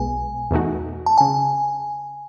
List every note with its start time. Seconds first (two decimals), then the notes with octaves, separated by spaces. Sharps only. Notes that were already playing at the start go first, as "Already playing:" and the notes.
Already playing: B1 B2 G#3 B3 G#5
0.51 E2 B2 A3 D#4 F#4
1.06 A5
1.18 C#3 G#5